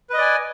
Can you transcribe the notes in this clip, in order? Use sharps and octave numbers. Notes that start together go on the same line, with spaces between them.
B4 D5 D#5 G#5